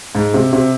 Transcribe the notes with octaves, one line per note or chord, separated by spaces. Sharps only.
G#2
C3
C3